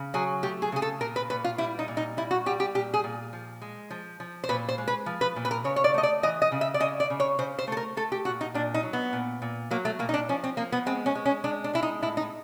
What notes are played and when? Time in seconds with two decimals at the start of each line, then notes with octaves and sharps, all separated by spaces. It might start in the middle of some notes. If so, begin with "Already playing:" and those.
Already playing: C#3
0.14 F#3 G#4
0.43 A3 G4
0.62 G#4
0.72 C#3 G#4
0.82 A4
1.01 A#2 A#4
1.16 B4
1.30 A#2 B4
1.44 F4
1.58 G3 E4
1.79 D#4
1.88 A#2
1.97 D#4
2.17 G3 E4
2.31 F#4
2.46 G3 G4
2.60 G4
2.75 A#2 G4
2.94 G#4
3.04 A#2
3.33 F3
3.62 G#3
3.91 F3
4.20 F3
4.44 C5
4.49 A#2 B4
4.69 C5
4.78 G#3
4.88 B4
5.06 F3
5.21 B4
5.36 A#2
5.45 B4
5.51 A#4
5.64 C#3 C#5
5.76 C#5
5.84 D5
5.94 A3 D#5
6.03 D5
6.23 E3 D#5
6.42 D#5
6.52 C#3
6.61 E5
6.74 D5
6.80 C#3 D#5
7.00 D5
7.10 C#3
7.20 C#5
7.39 C#3 C5
7.59 C5
7.67 A3 A4
7.77 A#4
7.97 A3 A4
8.12 G4
8.25 A#2 F#4
8.41 D#4
8.54 A#2 D4
8.74 D#4
8.83 F#3
8.93 B3
9.13 A#2
9.42 A#2
9.71 F#3 A#3
9.85 A3
9.99 A#2 A#3
10.09 D#4
10.14 D4
10.29 F3 C#4
10.44 C4
10.57 F3 A#3
10.72 B3
10.86 G#3 C4
11.06 C#4
11.15 G#3
11.25 C#4
11.44 G#3 D4
11.64 D4
11.74 G#3 E4
11.83 D#4
12.02 A2 E4
12.17 D#4